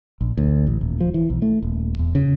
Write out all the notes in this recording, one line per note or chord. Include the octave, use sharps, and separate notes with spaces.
A#1
D2
A1
D#1
F3
E3
B1
A3
D#1
E2
C#3